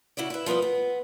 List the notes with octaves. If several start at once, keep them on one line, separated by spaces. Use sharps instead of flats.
C#3 E4 F#4 D5
E4 B4
F3 G3 B3 B4 D#5
B3